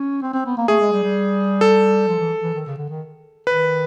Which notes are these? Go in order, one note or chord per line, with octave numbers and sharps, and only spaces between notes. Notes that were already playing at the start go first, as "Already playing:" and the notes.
Already playing: C#4
C4
C4
B3
A#3
A3 G#4
G#3
G3
G3
A4
F3
E3
E3
D#3
C#3
D3
D#3
D#3 B4